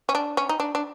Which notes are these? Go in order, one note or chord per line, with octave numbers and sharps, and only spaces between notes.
C#4
D4
C#4
D#4
D4
D4